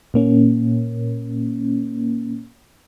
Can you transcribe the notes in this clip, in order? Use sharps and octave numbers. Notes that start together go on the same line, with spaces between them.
A#2 A#3 C#4